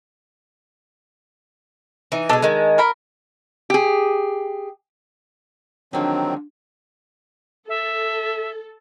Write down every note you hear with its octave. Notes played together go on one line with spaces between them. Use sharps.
E3 D#4
B2 G#3 D4 A4
D#3 G#3
D#3 A#4 B5
G4 G#4
D3 D#3 F3 F#3 G#3 C4
A4 E5